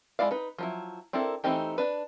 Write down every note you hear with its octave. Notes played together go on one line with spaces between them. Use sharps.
G#3 C4 E4 D5 F5
D#4 B4
F3 F#3 E4
C4 D4 E4 A4 A#4
E3 A3 C4 D#4 G4
D4 B4